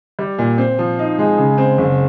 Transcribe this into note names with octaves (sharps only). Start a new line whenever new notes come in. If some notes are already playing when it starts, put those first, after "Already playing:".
G3
A#2
C4
F3
D#4
G#3
C#3
C4
F#1